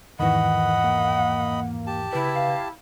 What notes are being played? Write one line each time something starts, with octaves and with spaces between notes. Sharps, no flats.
E2 G#2 D#3 E3 D#5 F#5 B5
A#3
G4 A5
C#3 E4 B4
F5